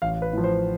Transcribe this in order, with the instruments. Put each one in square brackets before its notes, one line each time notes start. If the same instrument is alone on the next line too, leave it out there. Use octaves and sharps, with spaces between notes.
[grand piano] A1 F5
B4
A2 F3
C5